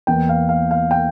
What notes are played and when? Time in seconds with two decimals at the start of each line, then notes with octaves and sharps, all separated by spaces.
0.07 E2 E3 A#3 G5
0.29 F5
0.49 F5
0.71 F5
0.91 G5